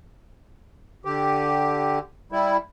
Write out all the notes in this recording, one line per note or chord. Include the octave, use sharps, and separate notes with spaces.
D3 G4
G3 E4